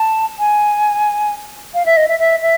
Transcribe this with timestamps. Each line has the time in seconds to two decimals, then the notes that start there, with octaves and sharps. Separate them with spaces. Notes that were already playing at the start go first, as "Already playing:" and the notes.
Already playing: A5
0.39 G#5
1.74 F5
1.86 E5
1.97 D#5
2.08 E5
2.20 E5
2.42 E5